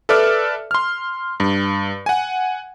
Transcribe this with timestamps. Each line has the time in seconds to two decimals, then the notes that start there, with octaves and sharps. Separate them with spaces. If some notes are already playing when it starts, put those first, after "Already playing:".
0.09 A4 B4 D5 E5 D6 F6
0.71 C6 F6
1.40 G2
2.06 F#5 G#5